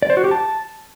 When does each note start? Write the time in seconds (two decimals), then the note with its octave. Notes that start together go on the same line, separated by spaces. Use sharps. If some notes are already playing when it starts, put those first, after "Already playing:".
0.02 D5
0.10 C5
0.17 F#4
0.24 G4
0.31 A5